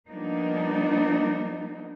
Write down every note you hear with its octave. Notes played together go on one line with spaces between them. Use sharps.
F3 G3 A#3 B3 D4 D#4